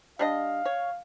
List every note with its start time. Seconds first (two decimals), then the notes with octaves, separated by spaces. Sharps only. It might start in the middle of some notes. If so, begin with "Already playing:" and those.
0.19 G3 D4 D#5 F5
0.65 C#5